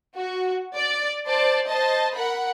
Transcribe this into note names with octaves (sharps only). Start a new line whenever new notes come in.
F#4
D5
C5 D5 A5
C5 D#5 A5
A#4 F#5 B5